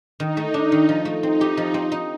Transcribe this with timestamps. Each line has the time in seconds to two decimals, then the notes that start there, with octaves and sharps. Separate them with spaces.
0.19 D#3 D#4
0.37 A3
0.54 D4
0.72 D#3
0.89 F3
1.05 A3
1.23 C4 D#4
1.41 G4
1.57 F3
1.74 C4
1.92 D#4